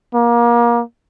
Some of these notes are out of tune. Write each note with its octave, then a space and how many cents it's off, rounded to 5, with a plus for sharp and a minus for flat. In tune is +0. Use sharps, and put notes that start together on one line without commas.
A#3 +25